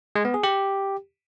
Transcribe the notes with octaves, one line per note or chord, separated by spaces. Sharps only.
G#3
B3
G#4
G4